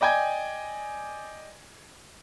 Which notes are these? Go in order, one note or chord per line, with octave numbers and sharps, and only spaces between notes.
D5 D#5 G5 G#5 G#6